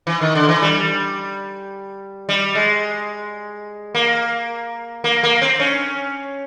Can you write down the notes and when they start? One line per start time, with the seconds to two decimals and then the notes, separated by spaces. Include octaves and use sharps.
0.07 E3
0.21 D#3
0.35 D3
0.49 E3
0.62 G3
2.29 G3
2.55 G#3
3.95 A#3
5.04 A#3
5.23 A#3
5.42 C4
5.60 C#4